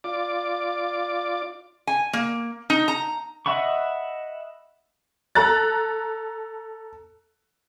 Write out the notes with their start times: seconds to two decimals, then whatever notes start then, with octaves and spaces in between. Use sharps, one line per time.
0.04 F4 D5 D6
1.87 G#5
2.13 A#3
2.70 D#4
2.88 A#5
3.46 D#5 E5 F#5 B5 C#6
5.35 A4 A#5 F#6 A6